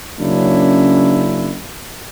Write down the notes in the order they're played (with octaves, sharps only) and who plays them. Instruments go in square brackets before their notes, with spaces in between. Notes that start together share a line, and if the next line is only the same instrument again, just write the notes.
[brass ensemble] C#3 F#3 A#3 C#4 D4 E4